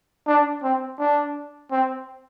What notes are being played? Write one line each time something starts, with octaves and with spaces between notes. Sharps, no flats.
D4
C4
D4
C4